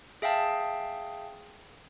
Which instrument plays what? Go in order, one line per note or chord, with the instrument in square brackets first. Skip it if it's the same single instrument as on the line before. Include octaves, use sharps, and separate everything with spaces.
[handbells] G#4 E5 F5 G5 A5